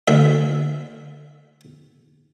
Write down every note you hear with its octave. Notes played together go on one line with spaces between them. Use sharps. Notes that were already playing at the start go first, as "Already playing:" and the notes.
D2 E5